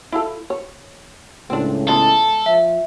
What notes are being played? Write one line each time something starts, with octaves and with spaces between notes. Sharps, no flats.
E4 F4 A4
C#5
C#2 A2 C4 D4
G#3 B3 A4 D#5
F3 E5